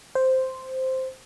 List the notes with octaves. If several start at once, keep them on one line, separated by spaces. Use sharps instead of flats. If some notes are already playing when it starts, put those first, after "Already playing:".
C5